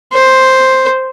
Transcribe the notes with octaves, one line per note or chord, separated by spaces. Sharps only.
C5